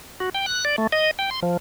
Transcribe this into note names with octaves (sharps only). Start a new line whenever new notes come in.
F#4
G5
F#6
D5
A3
D#5
G5
C6
F3